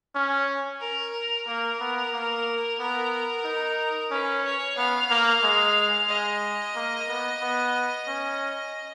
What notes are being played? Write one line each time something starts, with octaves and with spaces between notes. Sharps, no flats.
C#4
A#4
A#3 A#4
B3
A#3
B3 A#4
D#4
C#4 B4
C#5
B3 F5
A#3
G#3
G#3 D#5
A#3
B3
B3
C#4